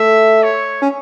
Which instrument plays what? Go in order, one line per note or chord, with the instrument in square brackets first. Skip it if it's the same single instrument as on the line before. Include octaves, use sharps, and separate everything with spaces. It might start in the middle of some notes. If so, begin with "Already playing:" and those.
Already playing: [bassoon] A3 [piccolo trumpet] E5
[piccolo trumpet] C#5
[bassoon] C#4